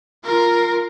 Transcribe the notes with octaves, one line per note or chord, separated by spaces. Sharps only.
F4 A#4